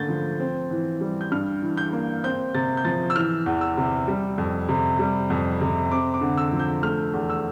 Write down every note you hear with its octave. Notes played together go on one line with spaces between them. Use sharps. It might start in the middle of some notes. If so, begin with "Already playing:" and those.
Already playing: D3 A3 A#3 G6 A6
F3
C4
E3
G3
G6
G2 F6
E3
G6
A#3
C4 G6
C3 A6
G6
F3 A6
E6
E3 F6
E2
E6
C3
G3
F2
C3
G3
F2
C3
C4 D6
D6
D3
E6
F3
G6
A3 F6
E2
E6